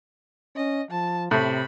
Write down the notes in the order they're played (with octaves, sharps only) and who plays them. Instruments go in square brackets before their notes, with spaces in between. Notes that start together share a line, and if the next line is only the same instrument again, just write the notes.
[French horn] C#4 [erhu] D#5
[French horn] F3 [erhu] A5
[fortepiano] A2 [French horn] C3 [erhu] B5